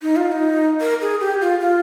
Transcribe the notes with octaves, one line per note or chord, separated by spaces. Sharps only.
D#4
F4
F4
D#4
A#4
G#4
G4
F4
F4